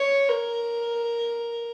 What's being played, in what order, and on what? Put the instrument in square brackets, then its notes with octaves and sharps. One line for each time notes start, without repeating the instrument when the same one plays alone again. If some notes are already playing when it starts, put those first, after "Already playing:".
Already playing: [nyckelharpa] C#5
A#4